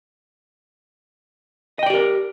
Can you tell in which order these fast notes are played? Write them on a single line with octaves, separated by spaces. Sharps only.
D#5 G5 D5 G4 A#4